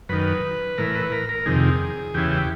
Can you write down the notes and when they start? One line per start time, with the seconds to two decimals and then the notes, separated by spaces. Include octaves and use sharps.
0.09 F#2 D#3 B4
0.78 A2 E3 A#4
0.95 B4
1.12 A#4
1.29 A#4
1.46 F2 C3 D#3 G#4
2.14 E2 C#3 E3 G4
2.31 G4